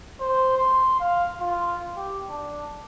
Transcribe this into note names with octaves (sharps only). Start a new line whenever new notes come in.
C5
C6
F5
F4
G4
D4